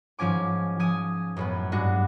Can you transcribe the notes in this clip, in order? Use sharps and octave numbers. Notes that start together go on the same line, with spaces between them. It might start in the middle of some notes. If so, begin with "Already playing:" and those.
G#2 F3 C#4 G#5 D6
F3 G#5 D#6
F#2 A2 B3
G2 G#3 D4 F#4